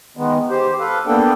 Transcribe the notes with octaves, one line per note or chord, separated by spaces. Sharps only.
D#3 G#3 B3
G4 C5
A4 B4 F5
A#3 B3 D4 A4 G5